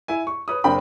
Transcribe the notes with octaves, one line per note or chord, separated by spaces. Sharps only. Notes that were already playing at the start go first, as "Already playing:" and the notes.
E4 E5 G#5
C#6
B4 C#5 D#6
F#1 C4 D4 A#4 G5 B5